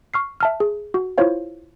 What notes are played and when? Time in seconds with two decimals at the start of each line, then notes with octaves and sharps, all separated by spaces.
0.14 C#6 F6 C7
0.40 E5 A5 F6
0.60 G#4
0.94 F#4
1.18 E4 F4 C5 C#5 F5